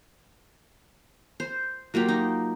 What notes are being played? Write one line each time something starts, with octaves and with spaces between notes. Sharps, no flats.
C5
F#3 A#3 F4 G4
D#4